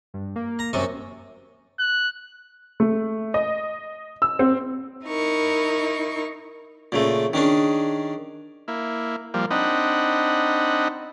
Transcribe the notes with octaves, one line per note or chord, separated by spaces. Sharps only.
G2
A#3
A#5
F#2 C3 C4 C#6
F#6
A3
D#5
E6
C4
D#4 E4 A#4 C#6
A#2 C#3 A3
D#3 C#4 D4 G#4
A#3 E4
F3 G3 A#3
C4 D4 D#4 D#5 F#5 B5